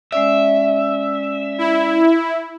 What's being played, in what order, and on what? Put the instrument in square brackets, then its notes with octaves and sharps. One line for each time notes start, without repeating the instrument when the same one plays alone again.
[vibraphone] G#3 C#4 D5 [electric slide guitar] E5
[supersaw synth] E4